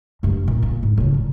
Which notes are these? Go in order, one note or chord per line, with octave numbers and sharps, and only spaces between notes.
D2 G2
A#2
A#3
G#2
A2 C#3
A#2